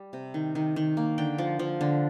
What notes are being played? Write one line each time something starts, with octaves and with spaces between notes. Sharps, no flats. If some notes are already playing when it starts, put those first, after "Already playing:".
Already playing: G3
C3
D#3
D#3
D#3
A#3
D3 G5
F3
F3
D3